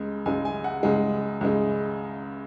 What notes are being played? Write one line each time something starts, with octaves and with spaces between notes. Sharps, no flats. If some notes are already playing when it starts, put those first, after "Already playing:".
Already playing: C#2 C#3 G#3
C#2 C#3 G#3 G#5
G#5
F#5
C#2 C#3 G#3
C#2 C#3 G#3